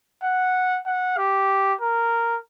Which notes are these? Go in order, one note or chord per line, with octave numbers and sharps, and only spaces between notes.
F#5
F#5
G4
A#4